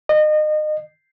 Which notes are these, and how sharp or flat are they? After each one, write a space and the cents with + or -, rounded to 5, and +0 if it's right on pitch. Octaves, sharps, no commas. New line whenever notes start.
D#5 -30